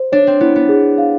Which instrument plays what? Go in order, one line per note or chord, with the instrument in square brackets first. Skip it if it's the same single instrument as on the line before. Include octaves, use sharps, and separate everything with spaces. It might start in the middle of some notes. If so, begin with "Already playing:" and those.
Already playing: [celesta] C5
[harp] D4 [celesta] C#5
[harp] C4
[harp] B3 [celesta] E4
[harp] B3
[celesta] G#4
F5